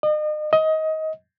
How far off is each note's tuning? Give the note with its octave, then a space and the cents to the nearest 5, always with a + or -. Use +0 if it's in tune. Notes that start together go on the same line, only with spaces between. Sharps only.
D#5 -40
D#5 +20